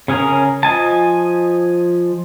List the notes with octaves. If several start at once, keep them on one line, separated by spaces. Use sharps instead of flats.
C#3 C#4 G#4 A#4
F3 D#5 G#5 A5